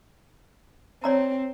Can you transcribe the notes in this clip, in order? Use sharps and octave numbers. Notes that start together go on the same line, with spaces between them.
C4 C#5 D5 A#5